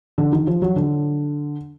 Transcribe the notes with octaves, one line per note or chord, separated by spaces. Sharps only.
D3
D#3
F3
F#3
D3